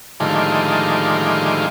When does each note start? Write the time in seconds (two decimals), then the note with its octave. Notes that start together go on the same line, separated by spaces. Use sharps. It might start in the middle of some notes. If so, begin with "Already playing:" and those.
0.20 A2 D3 D#3 F3 G3 G#3